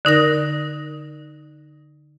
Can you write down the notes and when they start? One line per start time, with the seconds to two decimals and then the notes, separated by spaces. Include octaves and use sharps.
0.05 D3 D#4 A#4 A#6